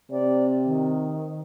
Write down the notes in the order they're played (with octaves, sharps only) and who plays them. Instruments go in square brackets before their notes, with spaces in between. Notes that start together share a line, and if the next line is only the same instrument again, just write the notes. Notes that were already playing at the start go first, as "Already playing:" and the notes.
[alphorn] C3 [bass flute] D5
[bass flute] D#3